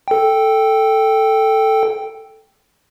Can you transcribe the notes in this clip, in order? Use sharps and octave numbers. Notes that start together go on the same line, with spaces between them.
A4 G5